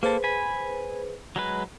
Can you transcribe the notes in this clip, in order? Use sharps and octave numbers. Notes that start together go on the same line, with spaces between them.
A#3 G#4 A4 B4 C5
G#5 B5
F#3 G#3 B4